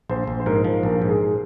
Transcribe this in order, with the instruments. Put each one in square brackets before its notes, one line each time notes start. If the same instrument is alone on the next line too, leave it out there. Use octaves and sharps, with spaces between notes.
[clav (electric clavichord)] A#1 [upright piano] C5
[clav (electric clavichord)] A#1
[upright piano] C5
[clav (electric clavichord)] G#2 [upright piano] A#4
[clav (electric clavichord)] F3
[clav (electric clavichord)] A#1 [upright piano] A#4
[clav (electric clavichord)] G#2
[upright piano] G#4